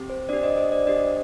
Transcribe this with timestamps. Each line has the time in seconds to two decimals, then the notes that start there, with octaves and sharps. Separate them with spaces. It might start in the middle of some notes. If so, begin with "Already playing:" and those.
Already playing: C4 G4
0.10 C5
0.29 D4 G4 D5
0.43 C5 D#5
0.57 C5 D#5
0.72 D5
0.87 D4 G4 C5 D#5